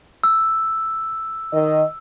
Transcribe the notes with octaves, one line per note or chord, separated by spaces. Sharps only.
E6
D#3 D#5